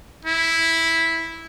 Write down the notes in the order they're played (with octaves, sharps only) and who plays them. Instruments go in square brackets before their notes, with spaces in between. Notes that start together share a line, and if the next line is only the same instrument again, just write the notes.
[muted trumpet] E4